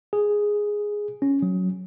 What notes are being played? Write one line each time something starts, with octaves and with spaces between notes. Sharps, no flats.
G#4
C#4
F#3